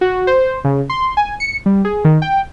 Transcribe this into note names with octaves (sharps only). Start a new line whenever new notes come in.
F#4
C5
C#3
C6
G#5
C#7
G3
G#4
D#3
G5